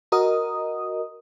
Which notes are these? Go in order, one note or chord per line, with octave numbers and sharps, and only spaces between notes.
F#4 A#4 D#5 D#6